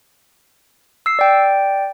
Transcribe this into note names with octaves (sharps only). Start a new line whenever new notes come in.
E6 C7
D5 G5